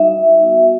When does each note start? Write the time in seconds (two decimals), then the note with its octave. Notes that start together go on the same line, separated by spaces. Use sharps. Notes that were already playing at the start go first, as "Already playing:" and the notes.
Already playing: G3 D#4 F#4 E5
0.42 B3 D#4 F#4